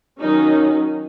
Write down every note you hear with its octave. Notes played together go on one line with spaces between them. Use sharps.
D#3 F#3 C#4 D#4